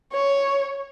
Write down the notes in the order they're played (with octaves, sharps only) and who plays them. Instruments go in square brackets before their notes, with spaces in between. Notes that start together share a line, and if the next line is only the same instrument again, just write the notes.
[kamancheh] C#5